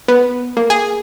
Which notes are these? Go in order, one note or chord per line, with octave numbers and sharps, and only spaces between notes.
B3
A#3
G#4